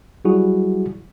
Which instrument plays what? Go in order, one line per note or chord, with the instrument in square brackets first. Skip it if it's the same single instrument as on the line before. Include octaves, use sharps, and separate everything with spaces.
[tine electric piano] F#3 G3 E4 F#4 G#4